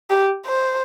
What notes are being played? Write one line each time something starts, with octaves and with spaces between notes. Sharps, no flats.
G4
C5